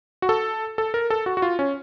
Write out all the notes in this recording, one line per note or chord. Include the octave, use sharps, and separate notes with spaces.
F#4
A4
A4
A#4
A4
F#4
F#4
F4
C#4